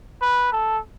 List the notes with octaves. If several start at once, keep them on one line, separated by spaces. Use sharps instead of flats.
B4
A4